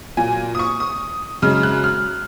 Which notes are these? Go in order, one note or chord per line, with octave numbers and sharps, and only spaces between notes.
A#2 F#3 A#3 G#5
D#6
C#6
D#6
F#2 C#3 G#3 F6
F#6
F6